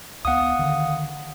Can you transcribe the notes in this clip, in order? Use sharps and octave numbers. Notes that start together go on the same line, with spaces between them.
D2 B3 F5 F#5 D#6
D3 D#3